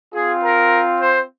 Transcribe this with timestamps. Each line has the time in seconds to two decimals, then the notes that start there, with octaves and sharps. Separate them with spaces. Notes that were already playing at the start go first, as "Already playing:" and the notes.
0.13 C4 F4 G#4
0.42 A#4
0.98 C5